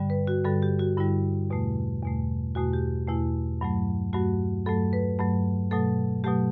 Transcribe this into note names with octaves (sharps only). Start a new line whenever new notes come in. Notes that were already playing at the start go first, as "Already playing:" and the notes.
Already playing: G2 D3 G3
B4
F#4
G2 D3 G3 A4
G4
F#4
G2 D3 G3 E4
E2 B2 A3
E2 B2 A3
E2 B2 A3 F#4
G4
E2 B2 A3 E4
G2 F#3 A3
G2 F#3 A3 F#4
G2 F#3 A3 A4
B4
G2 F#3 A3
B2 F#3 A3 A4
B2 F#3 A3 G4